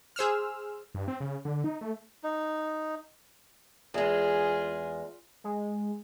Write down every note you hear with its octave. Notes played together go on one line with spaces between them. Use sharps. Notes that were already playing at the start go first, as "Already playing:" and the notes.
G#4 C5 E6 F6
G2
C4
C#3
D3
D#4
A3
D#4
E2 G#3 F4 G#4
G#3